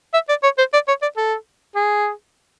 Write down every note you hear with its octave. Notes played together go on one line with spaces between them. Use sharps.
E5
D5
C#5
C5
D5
C#5
D5
A4
G#4